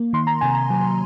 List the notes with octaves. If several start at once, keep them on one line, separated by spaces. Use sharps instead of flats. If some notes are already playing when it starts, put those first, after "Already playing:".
Already playing: A#3
D#3 C6
A#5
C3 G#5
A#5
F#3